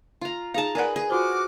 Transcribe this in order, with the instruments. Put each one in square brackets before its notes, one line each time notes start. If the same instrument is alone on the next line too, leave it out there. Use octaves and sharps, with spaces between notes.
[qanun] F4 A#5
[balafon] D#4 G#4 F5 [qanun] A5 A#5
[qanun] G#4 B4 [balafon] A#4 D5 F#5
[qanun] G#4
[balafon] F4 C5 [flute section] F#4 D6 F6